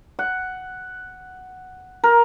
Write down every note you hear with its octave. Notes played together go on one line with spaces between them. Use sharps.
F#5
A#4